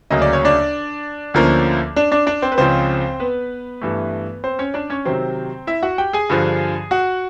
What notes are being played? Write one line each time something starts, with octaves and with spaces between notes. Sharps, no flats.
D2 C#3 F#3 A#3 D#5
D5
C#5
D4 D5
D2 D3 F3 A#3 C#4
D4 D5
D4 D5
D4 D5
C4 C5
B4
C#2 C#3 F3 C4 C5
B3 B4
G2 E3 A3
C4 C5
C#4 C#5
D4 D5
C#4 C#5
C3 D#3 F#3 C4 C5
E4 E5
F#4 F#5
G4 G5
G#4 G#5
G2 D3 F3
F#4 F#5